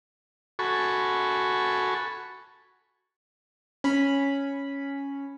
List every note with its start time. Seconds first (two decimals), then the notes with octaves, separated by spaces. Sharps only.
0.59 F#4 A4 G#5 B5 C#6
3.84 C#4 B5